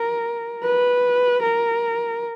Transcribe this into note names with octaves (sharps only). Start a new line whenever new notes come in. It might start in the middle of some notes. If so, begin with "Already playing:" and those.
Already playing: A#4
B4
A#4